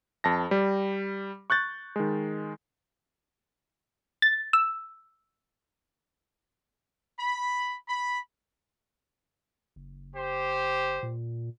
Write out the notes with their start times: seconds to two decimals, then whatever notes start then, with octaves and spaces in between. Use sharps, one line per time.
0.24 F2 A5 A#6
0.51 G3
1.50 C#6 F#6 G6 A6
1.96 D#3 G#3
4.22 A6
4.53 E6
7.20 B5
7.88 B5
9.76 F#1
10.15 G4 C5
11.03 A#2